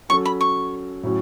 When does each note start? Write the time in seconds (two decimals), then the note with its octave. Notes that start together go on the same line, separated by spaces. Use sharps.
0.09 F#3 C#4 F#4 A4 C#6
0.25 B5
0.41 C#6
1.03 A2 F#3 C#4 F#4